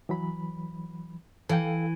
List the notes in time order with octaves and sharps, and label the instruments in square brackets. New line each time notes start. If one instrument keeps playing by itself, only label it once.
[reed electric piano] E3 F#3 B5
[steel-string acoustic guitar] E3 [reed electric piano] A4 F5 G5